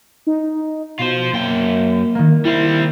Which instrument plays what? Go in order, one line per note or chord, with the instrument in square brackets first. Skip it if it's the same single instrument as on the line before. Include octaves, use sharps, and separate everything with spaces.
[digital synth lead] D#4
[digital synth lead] B2 [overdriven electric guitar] F4 C5
[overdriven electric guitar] F#2 G5 [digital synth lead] A#3
[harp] D#3 A#3
[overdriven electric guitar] G3 C4 [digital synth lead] E4